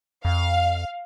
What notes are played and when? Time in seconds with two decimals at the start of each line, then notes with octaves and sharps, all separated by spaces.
0.25 F2 F5